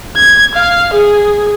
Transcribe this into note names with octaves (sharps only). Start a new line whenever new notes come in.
G#6
F5
G#4